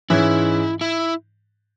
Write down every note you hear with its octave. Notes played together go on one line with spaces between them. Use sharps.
G#2 E3 G#3 C#4 E4
E4